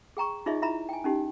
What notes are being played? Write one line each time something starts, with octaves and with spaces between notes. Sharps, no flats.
G#4 G5 A#5 C#6
D#4 F4 G#4 C#5 D#5 E5
E4 F4 E5 A#5 B5
G5 G#5
C#4 D#4 G4